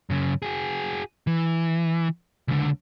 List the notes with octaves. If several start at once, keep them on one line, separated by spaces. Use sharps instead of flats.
F#2 C#3
F#4 G#4
E3
C#2 D3